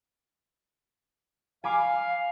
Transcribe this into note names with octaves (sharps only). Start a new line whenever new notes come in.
F5 G#5 B5 D6